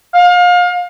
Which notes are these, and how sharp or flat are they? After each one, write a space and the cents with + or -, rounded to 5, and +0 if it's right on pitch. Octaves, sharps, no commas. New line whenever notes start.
F5 +30